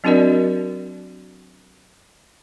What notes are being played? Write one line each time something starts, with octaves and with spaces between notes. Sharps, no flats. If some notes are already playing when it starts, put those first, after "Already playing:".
F#3 C4 D4 F#4 A#4 D5